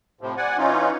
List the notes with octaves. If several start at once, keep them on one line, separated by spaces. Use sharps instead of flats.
A2 C3 F3
D5 F#5 G#5
E3 C#4 D#4 F4